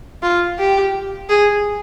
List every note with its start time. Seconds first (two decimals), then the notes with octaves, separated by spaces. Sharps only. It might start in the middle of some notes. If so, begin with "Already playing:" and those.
0.23 F4
0.59 G4
1.29 G#4